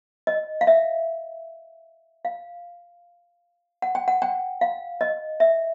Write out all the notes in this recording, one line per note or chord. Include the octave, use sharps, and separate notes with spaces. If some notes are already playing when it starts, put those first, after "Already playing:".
D#5
F5
E5
F5
F#5
G5
F#5
G5
F5
D#5
E5